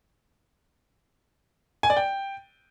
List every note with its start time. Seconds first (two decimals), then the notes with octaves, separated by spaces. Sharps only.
1.83 G#5
1.90 D5
1.97 G5